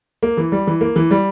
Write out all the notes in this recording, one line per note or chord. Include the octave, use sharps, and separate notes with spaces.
A#3
E3
G3
E3
A#3
E3
G3